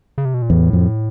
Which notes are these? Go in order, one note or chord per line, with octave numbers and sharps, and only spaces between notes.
C#3
C3
B2
A#2
E2 A2
F2